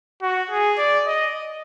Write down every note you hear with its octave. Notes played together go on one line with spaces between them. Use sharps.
F#4
G#4
D5
D#5